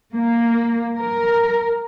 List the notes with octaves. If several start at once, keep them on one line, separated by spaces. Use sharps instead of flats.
A#3
A#4